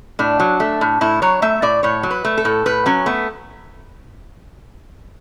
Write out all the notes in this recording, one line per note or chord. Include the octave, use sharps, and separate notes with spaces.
A2 D4
F#3
A3
A2
A2 E4
F#3 C#5
A3 E5
A2 D5
A2 C#5
F#3
B4
A3
A4
A2
A2 B4
F#3 C#4
A3 B3